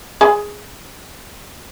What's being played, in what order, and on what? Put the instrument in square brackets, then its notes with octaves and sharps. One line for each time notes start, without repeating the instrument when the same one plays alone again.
[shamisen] G#4 G#5